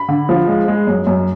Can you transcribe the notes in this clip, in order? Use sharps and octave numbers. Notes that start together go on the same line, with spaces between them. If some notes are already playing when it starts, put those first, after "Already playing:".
Already playing: B5
D3
F3
G#3
G#3
F#2
F#2